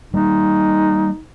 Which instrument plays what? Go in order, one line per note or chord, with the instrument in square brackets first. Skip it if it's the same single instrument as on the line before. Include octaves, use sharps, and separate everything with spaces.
[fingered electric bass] G3 A#3 [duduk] D#4